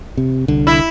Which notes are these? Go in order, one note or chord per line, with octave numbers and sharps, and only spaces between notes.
C3
C2 D3
E4